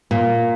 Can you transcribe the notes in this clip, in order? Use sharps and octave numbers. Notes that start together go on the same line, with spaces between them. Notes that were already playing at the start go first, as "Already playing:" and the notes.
A#2